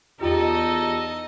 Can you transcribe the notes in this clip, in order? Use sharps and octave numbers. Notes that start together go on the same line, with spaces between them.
E2 D#4 F4 G4 A4 D#5